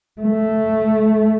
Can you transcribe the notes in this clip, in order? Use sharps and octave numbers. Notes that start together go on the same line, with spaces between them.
A3